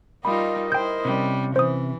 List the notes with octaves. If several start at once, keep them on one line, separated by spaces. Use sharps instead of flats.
G3 D#4 F4 A#4 D#5 B5
E4 C5 G5 G6
C3 G3 C#4
E3 C5 D#6